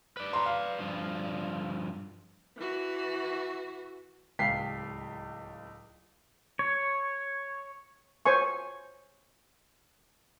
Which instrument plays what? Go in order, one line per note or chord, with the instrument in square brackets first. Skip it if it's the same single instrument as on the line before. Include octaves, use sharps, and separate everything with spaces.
[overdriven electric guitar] B4 D5
[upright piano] A#5 C6
F5
[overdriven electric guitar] G2 F3
[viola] E3 F#4
[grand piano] D1 C#2 F5 G5 B6 C7
[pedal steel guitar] C#5
[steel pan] C5 C#5 G#5 C#6